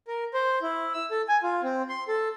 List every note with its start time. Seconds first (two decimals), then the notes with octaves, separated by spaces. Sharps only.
0.08 A#4
0.34 C5
0.62 E4
0.94 E6
1.11 A4
1.29 G#5
1.43 F4
1.63 C4
1.89 C6
2.08 A4